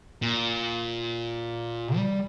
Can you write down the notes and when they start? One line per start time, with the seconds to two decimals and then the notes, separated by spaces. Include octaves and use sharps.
0.22 A#2
1.96 G3